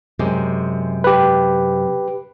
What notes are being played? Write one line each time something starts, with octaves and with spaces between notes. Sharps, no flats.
F#2 C3 G#3
G4 B4